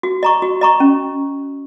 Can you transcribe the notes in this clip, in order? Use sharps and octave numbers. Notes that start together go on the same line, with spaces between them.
F#4
D#5 A#5 C#6
F#4
D#5 A#5 C#6
C#4